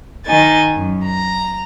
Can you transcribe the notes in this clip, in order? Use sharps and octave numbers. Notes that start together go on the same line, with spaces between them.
D#3 D#4 G#5 A6
F#2
A#5